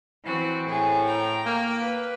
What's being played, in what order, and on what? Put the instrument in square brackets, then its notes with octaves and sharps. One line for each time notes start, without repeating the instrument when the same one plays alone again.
[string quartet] E3 C4 F#4
[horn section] A2 [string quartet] G#4
[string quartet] G5 A#5
[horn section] A#3
[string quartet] B4